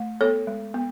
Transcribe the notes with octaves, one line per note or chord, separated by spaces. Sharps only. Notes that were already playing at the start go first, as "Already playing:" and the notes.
Already playing: A3
B3 A4 C#5
G#3
B3